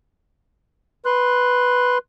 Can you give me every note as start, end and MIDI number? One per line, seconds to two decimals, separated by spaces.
1.06 1.98 71
1.06 1.98 84
1.06 1.98 90